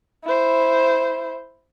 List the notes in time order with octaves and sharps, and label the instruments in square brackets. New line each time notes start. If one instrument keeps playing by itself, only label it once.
[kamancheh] E4 C5